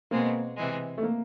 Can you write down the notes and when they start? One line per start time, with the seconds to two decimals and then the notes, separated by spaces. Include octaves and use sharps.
0.11 B2 G#3 A#3 C4
0.57 C3 E3 G#3
0.98 A3
1.03 A#3